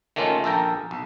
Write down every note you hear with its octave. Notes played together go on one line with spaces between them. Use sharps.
D#3 A3 A#3 C#4 F4
A#1 A4 A#4 G5 A#5
B1